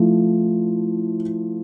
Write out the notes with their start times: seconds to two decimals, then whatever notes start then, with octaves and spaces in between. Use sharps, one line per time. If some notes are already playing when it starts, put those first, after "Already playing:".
Already playing: F3 A3 E4